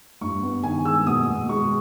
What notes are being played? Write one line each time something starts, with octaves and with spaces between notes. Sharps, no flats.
G2 C#6
B3
D#3 G#5
G#3 E6
B2 D#6
B2
G#3 C#6